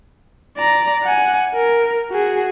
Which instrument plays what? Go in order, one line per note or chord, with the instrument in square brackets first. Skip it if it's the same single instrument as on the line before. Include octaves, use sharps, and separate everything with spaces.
[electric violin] D5 A#5
F#5 G#5
A#4
F#4 G#4